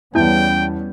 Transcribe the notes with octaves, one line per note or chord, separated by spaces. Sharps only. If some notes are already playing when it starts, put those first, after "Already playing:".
E2 G3 B3 C#4 E4 G5 A5 G6